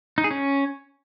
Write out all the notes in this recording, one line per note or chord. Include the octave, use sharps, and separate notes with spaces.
D#4
G#4
C#4